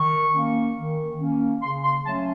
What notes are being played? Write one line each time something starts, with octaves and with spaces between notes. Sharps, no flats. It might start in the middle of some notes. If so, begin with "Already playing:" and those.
Already playing: D#3 C#6
A#3 C#4
D#3
A#3 C#4
C#3 C6
C6
F#3 A3 C#4 A5